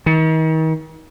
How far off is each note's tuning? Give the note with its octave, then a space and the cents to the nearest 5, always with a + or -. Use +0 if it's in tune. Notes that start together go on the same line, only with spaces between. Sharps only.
D#3 +40